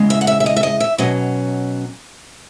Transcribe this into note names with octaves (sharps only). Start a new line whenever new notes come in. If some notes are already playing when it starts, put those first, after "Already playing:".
Already playing: E2 C#3 G#3
E5
F#5
E5
E5
D#5
E5
D#5
E5
B2 F#3 C#4 D#5